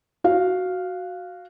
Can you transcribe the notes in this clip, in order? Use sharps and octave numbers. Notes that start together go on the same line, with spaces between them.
F#4 F5